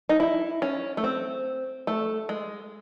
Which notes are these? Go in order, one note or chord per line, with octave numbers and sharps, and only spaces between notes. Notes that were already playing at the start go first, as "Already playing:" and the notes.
D#4
E4
C#4
A3
C4
A3
G#3